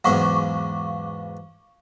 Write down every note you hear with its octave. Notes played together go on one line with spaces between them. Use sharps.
E2 G#2 F#3 F5 C#6 D6